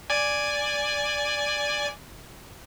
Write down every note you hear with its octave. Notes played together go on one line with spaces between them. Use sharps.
D5 G#5